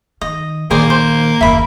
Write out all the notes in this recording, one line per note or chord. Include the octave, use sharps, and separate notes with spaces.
D#3 D#5
A#1 D#3 A#3 G#4 C5 D5
C5
F#1 D#2 E5 B5